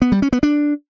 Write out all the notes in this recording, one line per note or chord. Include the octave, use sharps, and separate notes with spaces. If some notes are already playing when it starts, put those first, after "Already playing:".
B3
G3
C#4
B3
D4